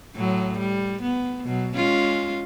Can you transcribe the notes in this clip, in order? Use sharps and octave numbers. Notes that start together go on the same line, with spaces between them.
A2 F#3
G3
B3
B2 F#3
G#3 C#4 F4